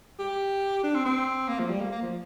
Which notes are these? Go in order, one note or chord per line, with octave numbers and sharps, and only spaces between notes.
G4
D4
C4
C4
A#3
F3
G3
A#3
A#3
F3